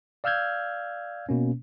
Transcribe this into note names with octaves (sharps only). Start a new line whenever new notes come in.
D5 F5 E6 F6 G6 G#6
B2 A#3 C#4